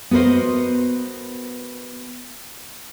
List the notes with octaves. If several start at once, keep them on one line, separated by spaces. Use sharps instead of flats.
B3 F#4 A#4 C5 D#5